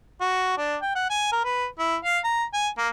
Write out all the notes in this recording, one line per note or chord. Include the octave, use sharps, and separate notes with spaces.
F#4
D4
G5
F#5
G#5
A#4
B4
E4
F5
A#5
G#5
A#3